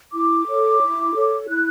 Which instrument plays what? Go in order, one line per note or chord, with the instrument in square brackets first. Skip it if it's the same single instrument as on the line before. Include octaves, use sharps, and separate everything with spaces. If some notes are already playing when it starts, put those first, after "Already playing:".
[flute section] E4 D6
A4 C#5
E4
A4 C#5
E4 F#6